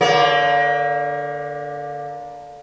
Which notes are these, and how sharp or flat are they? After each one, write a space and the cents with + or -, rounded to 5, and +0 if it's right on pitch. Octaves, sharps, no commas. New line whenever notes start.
D3 +0 A#3 +25 C#5 +45